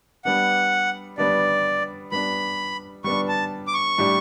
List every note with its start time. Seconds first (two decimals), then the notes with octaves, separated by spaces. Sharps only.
0.25 G3 B3 D4 F#5
1.18 G3 B3 D4 D5
2.11 G3 B3 D4 B5
3.04 G3 B3 D4 C#6
3.28 A5
3.67 D6
3.74 C#6
3.98 A2 G3 D4 G4